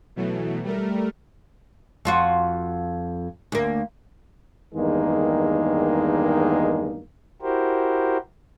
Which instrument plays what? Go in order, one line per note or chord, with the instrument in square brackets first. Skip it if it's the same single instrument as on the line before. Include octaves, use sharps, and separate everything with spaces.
[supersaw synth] B2 E3 F#3 A3
G3 A3 A#4
[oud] F2 F4 F#4
D2 A#3
[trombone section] E2 G2 D#3 G#3 A#3 D#4
[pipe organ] E4 F#4 G4 A#4 C5